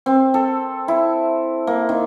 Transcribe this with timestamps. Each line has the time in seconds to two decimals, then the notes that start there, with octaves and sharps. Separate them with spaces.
0.06 C4
0.34 A4
0.88 E4
1.67 A#3
1.89 D#3